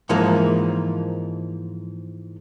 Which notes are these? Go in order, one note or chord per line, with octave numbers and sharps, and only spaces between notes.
G#2 E3 F3 G#3 A#3